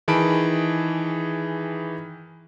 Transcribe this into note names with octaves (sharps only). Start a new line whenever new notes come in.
D#3 E3 G#4 A5 B5 D7